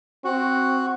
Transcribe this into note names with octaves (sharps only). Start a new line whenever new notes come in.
C4 F#4